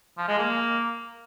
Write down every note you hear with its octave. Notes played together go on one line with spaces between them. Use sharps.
F3
G#3
A#3